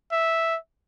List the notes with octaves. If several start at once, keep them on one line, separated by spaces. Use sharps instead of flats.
E5